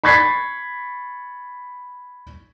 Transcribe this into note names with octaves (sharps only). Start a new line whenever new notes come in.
B5 C#6 G#6 A6 B6 C7